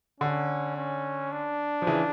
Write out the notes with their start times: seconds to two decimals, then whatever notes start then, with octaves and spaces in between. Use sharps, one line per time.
0.20 D3 C#4
0.77 C#4
1.32 D4
1.82 F3
1.87 C#3 E3